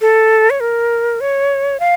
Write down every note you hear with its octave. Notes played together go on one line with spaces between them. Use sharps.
A4
C#5
A#4
C#5
F5